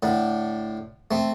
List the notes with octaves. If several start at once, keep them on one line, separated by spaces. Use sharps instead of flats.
A2 D3
A3 C4